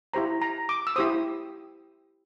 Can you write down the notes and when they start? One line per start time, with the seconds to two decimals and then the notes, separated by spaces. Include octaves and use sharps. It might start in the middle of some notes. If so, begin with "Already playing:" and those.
0.14 E4 G4 C5 A#5
0.41 A#5
0.69 D6
0.87 E6
0.96 E4 G4 C5 D#6